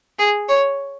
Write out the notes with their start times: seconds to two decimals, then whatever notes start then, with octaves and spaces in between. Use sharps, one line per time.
0.19 G#4
0.49 C#5